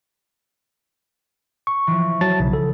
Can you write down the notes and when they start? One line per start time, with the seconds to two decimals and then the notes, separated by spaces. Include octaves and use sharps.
1.67 C#6
1.87 E3 F3
2.21 F#3 A5 A6
2.40 B1 C#3
2.53 A4